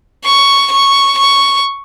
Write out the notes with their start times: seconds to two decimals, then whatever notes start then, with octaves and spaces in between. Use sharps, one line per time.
0.25 C#6
0.72 C#6
1.18 C#6